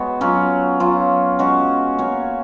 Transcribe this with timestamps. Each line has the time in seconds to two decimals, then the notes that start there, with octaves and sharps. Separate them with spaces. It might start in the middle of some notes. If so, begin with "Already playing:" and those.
Already playing: G#3 B3 F#4 C#5
0.21 F#3 C#4 F4
0.80 F#3 C#4 F4
1.39 G#3 C#4 F#4
1.99 A#3 C#4 F#4 C#5